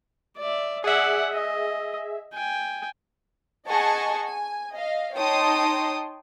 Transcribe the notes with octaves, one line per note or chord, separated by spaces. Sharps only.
D5 E5
G#4 D5 E5 F#5
D#5
G5 G#5
G#4 D#5 F#5 G#5 A5 C#6
G#5
D#5 F5
D#4 C#5 G5 A5 C6 D#6